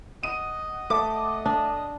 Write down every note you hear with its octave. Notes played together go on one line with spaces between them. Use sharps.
D#5 F#5 D#7
A3 D6
D4